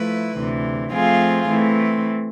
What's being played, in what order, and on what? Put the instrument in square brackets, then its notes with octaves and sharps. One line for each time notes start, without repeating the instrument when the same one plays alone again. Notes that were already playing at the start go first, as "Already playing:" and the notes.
Already playing: [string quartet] F3 A3 E4 B4
D2 C3 E3
F3 A3 C4 F4 G#4
E3 A3 C4